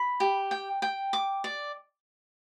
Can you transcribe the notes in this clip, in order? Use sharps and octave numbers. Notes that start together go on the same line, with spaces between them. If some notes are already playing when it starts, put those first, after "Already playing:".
Already playing: B5
G4
G5
G5
D6
D5